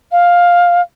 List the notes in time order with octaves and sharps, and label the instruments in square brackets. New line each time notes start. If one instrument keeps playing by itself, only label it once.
[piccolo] F5